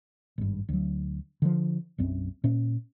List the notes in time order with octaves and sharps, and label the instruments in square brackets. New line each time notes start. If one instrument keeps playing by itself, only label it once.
[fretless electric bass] G#1 G2
D2 F#3
D3 F3
B1 F#2 C4
A#2 C#4